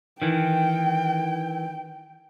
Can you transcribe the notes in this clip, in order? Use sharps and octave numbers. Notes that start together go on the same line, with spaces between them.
D#3 E3 G5